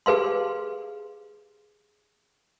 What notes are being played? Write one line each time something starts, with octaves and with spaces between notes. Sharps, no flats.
G4 G#4 B4 F5 C6